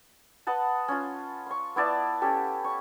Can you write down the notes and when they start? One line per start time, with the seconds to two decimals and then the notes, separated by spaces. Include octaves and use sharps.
0.47 B4 D#5 F#5 A5
0.88 C#4 F4
1.47 C6 C#6
1.76 B3 E4 D5 A5
2.22 C#4 G4 A4
2.64 C#6